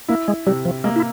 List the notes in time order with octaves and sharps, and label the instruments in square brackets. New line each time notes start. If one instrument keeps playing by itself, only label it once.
[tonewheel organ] A#3 [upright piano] E4
[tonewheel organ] G#3
[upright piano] C3 [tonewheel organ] G3
[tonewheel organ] F3
[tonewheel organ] G#3 [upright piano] A#3
[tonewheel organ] E4